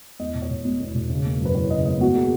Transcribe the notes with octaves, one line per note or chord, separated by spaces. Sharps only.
E2 D#5
E1
C#5
E1
B2
E2
E1
C#3
A#3
F#2 B4
E3 C#5
C#3 D#5
A#3 D#5
B2 F#4
A#3 G#4